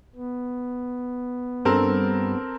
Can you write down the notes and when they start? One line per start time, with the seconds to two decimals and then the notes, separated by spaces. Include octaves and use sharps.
0.16 B3
1.65 G2 C4 A4 A#4